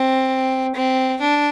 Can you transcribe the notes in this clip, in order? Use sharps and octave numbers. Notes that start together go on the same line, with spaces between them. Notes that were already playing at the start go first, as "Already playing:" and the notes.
Already playing: C4
C4
D4